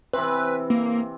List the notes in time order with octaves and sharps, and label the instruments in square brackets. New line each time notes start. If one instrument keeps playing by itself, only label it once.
[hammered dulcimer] C3 E3 C4 [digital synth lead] B4
[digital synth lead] A#3